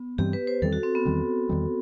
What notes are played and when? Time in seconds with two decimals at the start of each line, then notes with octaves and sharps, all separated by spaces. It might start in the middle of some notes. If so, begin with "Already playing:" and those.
Already playing: B3
0.18 G2 E3 G3 C4 G4
0.33 B4
0.47 C5
0.62 E2 D#3 G3 C4 A4
0.73 F#4
0.83 C4
0.95 B3
1.05 E2 D#3 G3 C4
1.49 E2 D#3 G3 C4